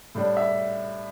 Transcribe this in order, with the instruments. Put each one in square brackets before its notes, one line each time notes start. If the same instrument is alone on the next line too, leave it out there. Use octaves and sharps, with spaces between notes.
[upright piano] A2 G3 D4
E5